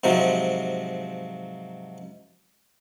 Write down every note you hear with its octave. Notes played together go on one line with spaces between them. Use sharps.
G#2 C3 F3 F#3